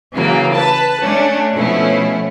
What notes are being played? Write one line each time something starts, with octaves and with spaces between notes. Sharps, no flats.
C#3 E3 F#3 A#3
B4 A5
A3 C#4 D4
B2 F3 A3 C#4 E4